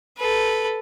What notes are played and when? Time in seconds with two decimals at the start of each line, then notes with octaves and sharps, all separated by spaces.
0.18 A4 B4